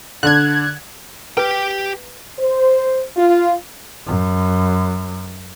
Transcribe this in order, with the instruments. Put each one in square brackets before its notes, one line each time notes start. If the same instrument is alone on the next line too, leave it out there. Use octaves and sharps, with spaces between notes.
[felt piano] D3 D4 [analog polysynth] F#6 G#6
[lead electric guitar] G4 G5 [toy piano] B4
[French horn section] C5
F4
[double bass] F#2